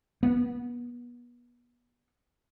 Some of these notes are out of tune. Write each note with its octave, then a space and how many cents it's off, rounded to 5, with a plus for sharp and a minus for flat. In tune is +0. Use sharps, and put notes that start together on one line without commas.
B3 -30